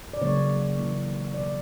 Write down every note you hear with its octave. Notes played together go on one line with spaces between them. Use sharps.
D5
C#3 F#3 A#3 C#5
C#3 E3 A#3
B2 A#3 D5